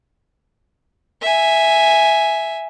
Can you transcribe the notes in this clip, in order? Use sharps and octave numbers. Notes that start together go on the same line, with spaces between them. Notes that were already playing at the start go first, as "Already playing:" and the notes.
E5 G#5